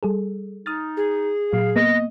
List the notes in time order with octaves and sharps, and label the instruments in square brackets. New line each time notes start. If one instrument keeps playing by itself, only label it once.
[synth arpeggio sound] G3 G#4 A4
[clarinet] D#4 [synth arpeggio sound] D#6 F6 A6
[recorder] G#4
[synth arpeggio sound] A#2 F#3 [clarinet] F5
[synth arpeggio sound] A#3 B3 [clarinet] D#5 [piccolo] A#6